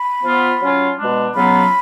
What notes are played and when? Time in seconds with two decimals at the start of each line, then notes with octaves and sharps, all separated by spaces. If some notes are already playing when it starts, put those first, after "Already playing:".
Already playing: B5
0.22 F3 B3 F4
0.60 F#3 C#4 F4
0.97 B2 G#3 D4
1.34 C#3 F#3 B3 F4 B5